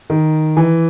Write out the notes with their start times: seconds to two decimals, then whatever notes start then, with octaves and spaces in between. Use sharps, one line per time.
0.10 D#3
0.57 E3